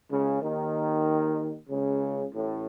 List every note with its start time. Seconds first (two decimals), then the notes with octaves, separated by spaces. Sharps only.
0.10 C#2 C#3
0.41 D#2 D#3
1.69 C#2 C#3
2.33 A1 A2